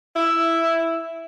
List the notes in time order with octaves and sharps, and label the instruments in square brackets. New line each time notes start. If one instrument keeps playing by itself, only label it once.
[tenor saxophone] E4